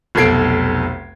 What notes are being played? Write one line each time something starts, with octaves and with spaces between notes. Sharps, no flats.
F1 B1 A4 G#6 C7 D7